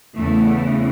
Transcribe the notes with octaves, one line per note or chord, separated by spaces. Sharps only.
E2 C#3 E3 A3